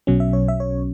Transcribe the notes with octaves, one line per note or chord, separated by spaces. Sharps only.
B1 B2 F#3 C#4
E5
C#5
E5
C#5